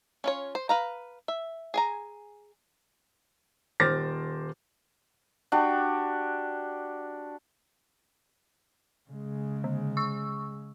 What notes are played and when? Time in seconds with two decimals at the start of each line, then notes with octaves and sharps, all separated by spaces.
0.24 C#4 F4 C#5
0.55 C5
0.69 B4 F5 A#5
1.28 E5
1.74 G#4 G#5 A#5
3.80 D#1 C5 D6 F6 A6 A#6
5.52 D4 F#4 G4
9.09 C#3 G#3
9.64 D3
9.97 C#6 E6